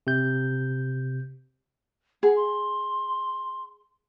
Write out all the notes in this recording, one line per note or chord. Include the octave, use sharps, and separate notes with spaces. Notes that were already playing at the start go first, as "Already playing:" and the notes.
C3 G6
G#4 F#5
C6